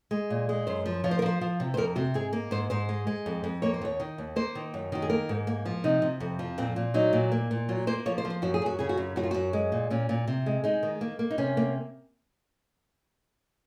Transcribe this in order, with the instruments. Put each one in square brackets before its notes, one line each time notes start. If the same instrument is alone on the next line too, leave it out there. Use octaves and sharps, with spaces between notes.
[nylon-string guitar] G#3
A#2
G#3
F#2 C5
F3
F3 C#5
C5
A#4
F3 C5
F3
C3
C5
F2 A#4
C3 F#4
G#2 G#4
A#3
G#2 C5
G#2 C5
G#3
G#3
F2
F2
A#3 C#5
C5
D#2 C#5
D#3
D#2
A#3 C5
D#3
F#2
D#3 F#4
G#4
A#3 A#4
G#2
A#3
F3
C3 D#4
C3
F2
F3
A#2 C4
A#2
F#3 D#4
A#2
A#3
A#2
F#3 F4
A#3 C5
F3 C#5
C5
F3
C5
F#2 F#4
G#4
F#2 F#4
C#3 G#4
F#4
F#2
F#2 F#4
F4
F#2 F#4
G#3
A#2
A#2 C#4
A#2
C3
G#3
G#3 D#4
D#3
A#3
A#3
D#4
C3 C#4
A#3